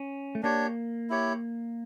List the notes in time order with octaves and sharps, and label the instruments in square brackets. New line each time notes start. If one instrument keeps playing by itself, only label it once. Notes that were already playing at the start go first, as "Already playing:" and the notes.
Already playing: [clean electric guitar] C#4
A3
[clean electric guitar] A#3 [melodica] D4 G4 C#5
[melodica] E4 G4 C#5